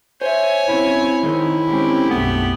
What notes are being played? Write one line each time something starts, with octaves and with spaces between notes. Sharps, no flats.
C5 C#5 E5 G#5
B1 C#3 C4 E4
D#3 G#3 C4 D#4
D3 G#3 C4 C#4 G4
B1 F#2 A3 B3